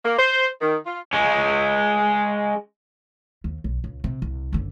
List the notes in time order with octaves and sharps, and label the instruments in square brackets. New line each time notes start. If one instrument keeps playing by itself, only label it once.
[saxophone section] A#3
C5
D#3
F4
[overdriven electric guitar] G#3 C#4
[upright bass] D#2
B1
C#2
C3
C2
F#1 D3